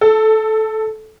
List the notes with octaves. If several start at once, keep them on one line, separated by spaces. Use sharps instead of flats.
A4